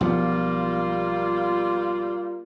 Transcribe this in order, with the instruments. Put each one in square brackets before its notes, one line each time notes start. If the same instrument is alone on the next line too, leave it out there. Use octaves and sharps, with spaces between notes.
[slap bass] B1 F3 B3 [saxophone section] G3 A#3 F4